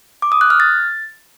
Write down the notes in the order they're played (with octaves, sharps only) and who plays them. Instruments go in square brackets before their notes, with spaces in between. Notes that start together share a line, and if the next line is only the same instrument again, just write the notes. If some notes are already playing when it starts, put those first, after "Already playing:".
[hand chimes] D6
D#6
F#6
F6
A6